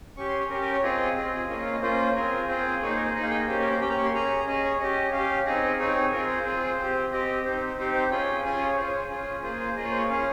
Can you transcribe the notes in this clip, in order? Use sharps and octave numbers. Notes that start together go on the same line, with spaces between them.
C#4 G4 C#6
C6
C#5
C#4 G4 A#4
A#4
C#5
C4 F4 G#4 D#5
C4 F4 G#4
A#3 C#4 F4 C#5
D#5
F5
D#5
A#3 C#4 F4 C5
C4 F4 G#4 A#4
C4 F4 G#4 C5
A#3 D#4 G#4 C#5
C5
A#4
C5
A#3 D#4 G#4 D#5
F5
G5
D#5
A#3 C#4 G4 C5
A#4
C5
A#3 C#4 G4 G5
A#5
C#6
C6
C#4 G#4 A#5
C#4 G#4 D#5
C#5
C#4 G4 D#5
C#4 G4 F5
C4 D#4 G#4 D#5
C4 D#4 G#4 C#5
C4 F4 G#4 A#4
C5
C4 F4 G#4
C4 G4
C4 G4 D#5
C4 D#4 G4 C5
C4 D#4 G4 C5
C5
C#4 F4 G#4 G5
C#4 F4 G#4 G#5
C#5
C#4 F4 G#4 C5
C#4 F4 G#4
A#3 F4 G#4 C5
C5
A#3 F4 G#4 D#5
C#5
C5
C#5
C#4 G#4 F5